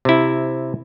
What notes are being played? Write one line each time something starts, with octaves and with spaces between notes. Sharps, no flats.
C3 E4